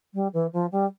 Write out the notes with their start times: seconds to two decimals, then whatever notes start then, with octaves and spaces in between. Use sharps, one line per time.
0.14 G3
0.33 E3
0.53 F3
0.72 G3